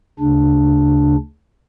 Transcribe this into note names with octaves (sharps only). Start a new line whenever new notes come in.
D2 C#3 D4